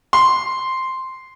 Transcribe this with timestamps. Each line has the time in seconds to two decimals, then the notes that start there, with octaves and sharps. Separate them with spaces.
0.13 C6